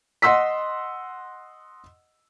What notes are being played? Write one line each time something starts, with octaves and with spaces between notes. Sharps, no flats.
D#5 F#5 C6 E6 B6